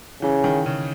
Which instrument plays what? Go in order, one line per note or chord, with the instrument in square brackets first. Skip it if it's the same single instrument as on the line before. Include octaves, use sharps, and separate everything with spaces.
[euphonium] C#3 [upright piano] E3
[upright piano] D#3
C#3